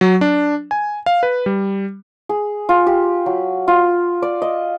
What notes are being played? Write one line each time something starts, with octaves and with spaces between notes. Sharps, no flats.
F#3
D4
G#5
F5
B4
G3
G#4
F4
G4
F#3
F4
D5
D#5